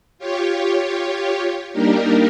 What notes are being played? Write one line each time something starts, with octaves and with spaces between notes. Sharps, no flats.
F4 G4 C#5
G3 A#3 D4 D#4 G4 A#4